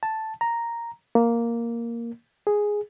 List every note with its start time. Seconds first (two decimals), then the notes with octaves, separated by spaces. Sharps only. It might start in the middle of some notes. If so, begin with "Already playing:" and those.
0.03 A5
0.41 A#5
1.15 A#3
2.47 G#4